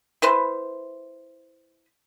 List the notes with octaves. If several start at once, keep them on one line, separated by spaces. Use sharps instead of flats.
E4 B4 C5